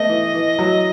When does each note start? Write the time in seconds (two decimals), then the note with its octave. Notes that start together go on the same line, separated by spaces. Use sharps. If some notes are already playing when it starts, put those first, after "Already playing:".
Already playing: A3 B3 D#5
0.09 E3
0.34 E3
0.59 F#3